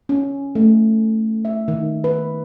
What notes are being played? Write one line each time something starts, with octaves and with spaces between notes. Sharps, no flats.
C#4
A3
E5
D#3
B4